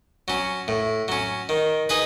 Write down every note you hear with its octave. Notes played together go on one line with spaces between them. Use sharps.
F#3 C#4
A2
F#3 C#4
D#3
D#4 G#4 B4